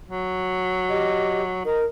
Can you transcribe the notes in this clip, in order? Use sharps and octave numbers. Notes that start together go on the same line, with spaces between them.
F#3
G4 D#5
D#4 A#4